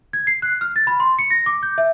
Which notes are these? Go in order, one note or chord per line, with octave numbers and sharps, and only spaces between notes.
G#6
C7
F#6
F6
A6
B5
C6
C#7
A#6
D6
G6
E5